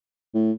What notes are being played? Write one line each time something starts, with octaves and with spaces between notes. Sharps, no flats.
A2